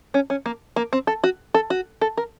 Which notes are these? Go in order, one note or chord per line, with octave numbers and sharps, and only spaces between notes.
C#4
C#4
A#3
A#3
C4
A4
F#4
A4
F#4
A4
A#4